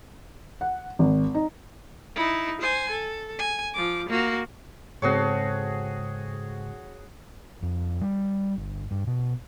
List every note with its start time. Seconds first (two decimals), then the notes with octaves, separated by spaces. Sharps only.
0.61 F#5
0.99 G#1
1.34 D#4
2.16 D#4 E4
2.61 C5 G#5
2.91 A4
3.39 G#5
3.74 F3 D6
4.08 A#3 F#4
5.02 G#2 C#3 G#3 C4 F#4 G#4 A4 C#5
7.62 F2
8.01 G3
8.58 G1
8.91 G2
9.07 B2